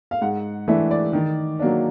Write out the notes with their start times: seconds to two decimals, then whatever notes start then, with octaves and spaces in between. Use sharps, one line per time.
0.11 F5
0.21 G#2 F#5
0.68 E3 A3 D4 E5
0.91 D5
1.13 D#3
1.59 F#3 A#3 D4